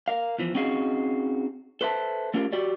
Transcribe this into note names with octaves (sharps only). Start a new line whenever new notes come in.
A#4 F5
E2 E3 F3
C4 C#4 D#4 F#4 G#4 F5
A4 B4 C5 E5 A5
A3 C#4 F4 G4 A#4
F#4 G4 D5